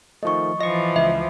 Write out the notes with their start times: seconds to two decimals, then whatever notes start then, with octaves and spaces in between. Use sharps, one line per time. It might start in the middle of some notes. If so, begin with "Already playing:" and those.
0.23 D#3 F3 A3 D#5 C#6
0.61 E3 F3 D#5 C#6 A#6
0.96 C#2 E5